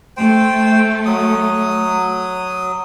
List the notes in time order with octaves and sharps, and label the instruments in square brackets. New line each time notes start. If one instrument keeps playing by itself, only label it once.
[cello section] A3 [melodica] C5 G5
[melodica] F#3 D#6